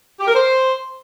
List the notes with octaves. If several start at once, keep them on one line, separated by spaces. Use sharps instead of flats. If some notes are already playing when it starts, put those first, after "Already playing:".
G4
A#4
C5